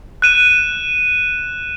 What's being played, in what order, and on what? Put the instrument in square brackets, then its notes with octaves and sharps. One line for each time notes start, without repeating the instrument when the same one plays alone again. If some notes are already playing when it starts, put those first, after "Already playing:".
[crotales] F#6 D#7 E7